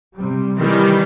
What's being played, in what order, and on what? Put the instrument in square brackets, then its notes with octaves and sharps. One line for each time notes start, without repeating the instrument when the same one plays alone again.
[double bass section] C3 G3
[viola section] D#3 G3 [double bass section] E3